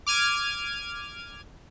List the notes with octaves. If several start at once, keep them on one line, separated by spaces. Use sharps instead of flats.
D6 F6 G#6 D#7